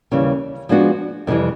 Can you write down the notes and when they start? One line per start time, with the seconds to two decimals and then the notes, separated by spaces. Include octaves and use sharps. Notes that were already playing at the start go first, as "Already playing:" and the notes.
0.11 D#2 C#3 E3 G3
0.69 F3 G#3 B3 D4 F#4
1.27 F2 C3 E3 G3